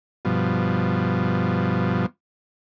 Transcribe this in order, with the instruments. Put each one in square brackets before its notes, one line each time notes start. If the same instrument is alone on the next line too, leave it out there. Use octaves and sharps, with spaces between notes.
[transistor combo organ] G2 B2 F3